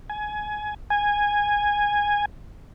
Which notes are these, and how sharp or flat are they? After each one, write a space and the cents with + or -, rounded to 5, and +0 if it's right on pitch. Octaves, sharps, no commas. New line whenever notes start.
G#5 +20
G#5 -10